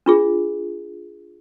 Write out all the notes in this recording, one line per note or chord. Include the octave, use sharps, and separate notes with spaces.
D4 F4 G#4